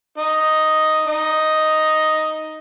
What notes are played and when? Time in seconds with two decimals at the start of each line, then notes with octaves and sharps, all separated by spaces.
0.18 D#4
1.07 D#4